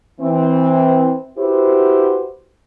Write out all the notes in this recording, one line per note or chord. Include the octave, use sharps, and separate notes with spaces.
E3 C4
E4 F#4 G4 B4 C5